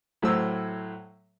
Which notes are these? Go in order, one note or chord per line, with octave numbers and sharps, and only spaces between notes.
A2 F#3 C5 E6